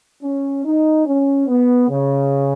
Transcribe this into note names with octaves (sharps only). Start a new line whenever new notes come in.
C#4
D#4
C#4
B3
C#3